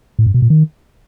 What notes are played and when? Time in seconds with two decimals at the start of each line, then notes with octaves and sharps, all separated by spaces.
0.19 A2
0.27 G2
0.34 B2
0.42 A#2
0.50 D#3